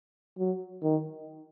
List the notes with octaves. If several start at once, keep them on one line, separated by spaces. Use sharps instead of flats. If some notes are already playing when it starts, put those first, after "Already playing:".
F#3
D#3